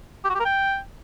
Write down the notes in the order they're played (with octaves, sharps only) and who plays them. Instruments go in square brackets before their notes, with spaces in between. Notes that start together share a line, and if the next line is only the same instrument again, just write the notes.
[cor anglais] G4
F#4
G4
A#4
G5